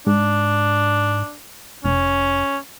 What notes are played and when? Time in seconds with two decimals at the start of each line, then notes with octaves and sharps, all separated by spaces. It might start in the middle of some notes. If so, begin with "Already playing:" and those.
0.06 G#2 D4
1.84 F1 C#4